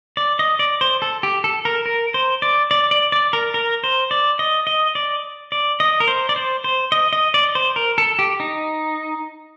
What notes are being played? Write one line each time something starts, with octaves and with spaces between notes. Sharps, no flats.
D5
D#5
D5
C5
A4
G4
A4
A#4
A#4
C5
D5
D5
D5
D5
A#4
A#4
C5
D5
D#5
D#5
D5
D5
D#5
A#4
C5
D5
C5
C5
D#5
D#5
D5
C5
A#4
A4
G4
D#4